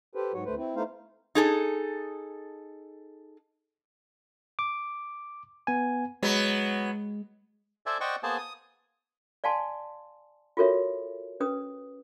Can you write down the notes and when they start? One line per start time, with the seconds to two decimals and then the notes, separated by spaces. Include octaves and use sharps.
0.15 G4 A4 B4 C5
0.33 G#2 F#3 F#4 C#5
0.45 D2 A3 B4 C5
0.57 C4 E4
0.76 A3 B3 D#4 E4 C5 F5
1.35 D#4 G#4 A4
4.59 D6
5.67 B3 G#5
6.23 F#3 G#3 B3
7.86 A4 C5 D5 E5 G#5
8.00 C5 D5 D#5 F#5 G5 C#6
8.23 A#3 B3 G#4 C5 G#5 A5
8.38 D#6
9.44 D5 F5 G#5 A5 C6
10.57 F4 F#4 A4 A#4 C#5 E5
11.40 C#4 B4 D#6